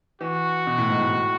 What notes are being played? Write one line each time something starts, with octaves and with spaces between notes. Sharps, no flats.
E3 F#4
B2
A2
G#2
A2